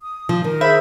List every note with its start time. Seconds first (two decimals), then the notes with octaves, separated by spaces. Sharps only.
0.01 D#6
0.29 F3
0.44 D#3 A#4
0.61 G#4 C5 E5 B5